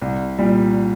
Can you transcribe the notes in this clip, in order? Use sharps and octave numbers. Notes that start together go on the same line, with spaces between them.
C2
A#2 G3